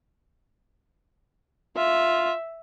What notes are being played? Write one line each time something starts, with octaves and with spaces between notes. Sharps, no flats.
F4 E5